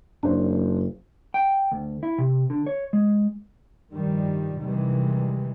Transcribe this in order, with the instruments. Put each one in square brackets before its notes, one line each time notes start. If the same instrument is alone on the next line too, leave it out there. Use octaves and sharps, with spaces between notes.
[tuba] F#1 [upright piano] D4 C5
[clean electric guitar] G5
D2
E4
C3
D3
C#5
G#3
[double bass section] G2 D#3 F3 G3
C3 D#3 E3 G3 G#3